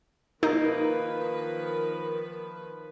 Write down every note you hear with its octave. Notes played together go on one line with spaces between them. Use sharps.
D#3 F3 A#3 D#4 B4